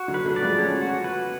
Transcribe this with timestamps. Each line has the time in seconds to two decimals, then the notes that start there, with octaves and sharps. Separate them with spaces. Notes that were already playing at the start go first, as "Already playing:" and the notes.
Already playing: F#4
0.08 D3 F#3
0.14 B4
0.25 F#3 A3
0.36 D5
0.43 F3 G#3
0.59 F#3 A3 C#4
0.82 F#4
1.04 B4